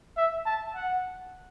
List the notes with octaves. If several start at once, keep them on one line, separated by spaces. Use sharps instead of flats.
E5
A5
F#5